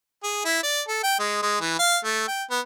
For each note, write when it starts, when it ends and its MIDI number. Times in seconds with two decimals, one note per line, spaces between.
0.24 0.42 68
0.45 0.60 64
0.63 0.81 74
0.88 1.03 69
1.04 1.18 79
1.19 1.42 56
1.42 1.60 56
1.61 1.75 52
1.79 1.98 77
2.04 2.26 57
2.28 2.43 79
2.50 2.59 59